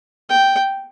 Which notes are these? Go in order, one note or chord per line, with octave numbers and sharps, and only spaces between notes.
G5